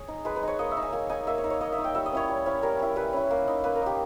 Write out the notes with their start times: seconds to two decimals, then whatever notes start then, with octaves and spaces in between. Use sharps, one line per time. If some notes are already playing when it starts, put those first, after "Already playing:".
Already playing: G#4 C#5
0.08 D#4
0.25 G#3 B4
0.36 B4
0.43 D#4 C#5
0.59 A#3 D#5
0.71 E5
0.77 D#4
0.82 G#5
0.93 A#3 G#5
1.09 D#4 G#5
1.27 A#3 E5
1.38 C#5
1.44 D#4
1.50 C#5
1.60 A#3 D#5
1.72 E5
1.78 D#4
1.84 G5
1.95 G3 E5
2.06 D#5
2.12 C#4 E4 C#5
2.29 G3
2.46 C#4 E4
2.63 G3 A#4
2.79 C#4 E4
2.96 G3 B4
3.13 C#4 E4
3.31 A#3
3.48 D#4
3.64 A#3 B4
3.75 A#4
3.82 D#4 G4